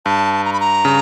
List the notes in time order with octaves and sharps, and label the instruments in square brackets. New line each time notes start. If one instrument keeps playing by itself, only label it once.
[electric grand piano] G2 [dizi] A5
[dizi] A#5
B5
A#5
[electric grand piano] C#3